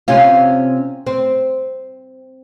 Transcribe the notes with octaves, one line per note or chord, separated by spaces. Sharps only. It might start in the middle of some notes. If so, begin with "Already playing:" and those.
C3 C#4 F4
C4